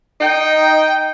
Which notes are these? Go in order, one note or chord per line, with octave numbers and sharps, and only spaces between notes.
D#4 G5